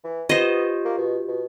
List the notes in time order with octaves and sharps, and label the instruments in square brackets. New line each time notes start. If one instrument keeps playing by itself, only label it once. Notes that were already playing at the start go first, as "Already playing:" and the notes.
[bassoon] E3
[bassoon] B3 [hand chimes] F4 G4 [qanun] C5 D#5
[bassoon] A#3
B2
B2